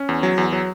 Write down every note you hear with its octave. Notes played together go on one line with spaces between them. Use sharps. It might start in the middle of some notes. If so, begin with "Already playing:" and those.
Already playing: C#4
E2
F#3
E2
F#3